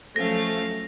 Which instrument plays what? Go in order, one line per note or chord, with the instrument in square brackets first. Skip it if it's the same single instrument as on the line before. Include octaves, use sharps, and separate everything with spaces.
[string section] F3 F#3 A3 [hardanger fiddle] C#4 F5 [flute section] A4 C5 [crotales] A#6